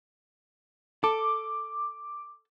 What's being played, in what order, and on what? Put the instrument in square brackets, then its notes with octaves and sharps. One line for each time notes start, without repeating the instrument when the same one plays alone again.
[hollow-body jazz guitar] A4 [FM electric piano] D6